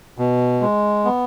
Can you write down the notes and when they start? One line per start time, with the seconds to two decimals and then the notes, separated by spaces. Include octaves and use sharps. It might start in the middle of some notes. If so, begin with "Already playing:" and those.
0.18 B2
0.61 G#3
1.05 B3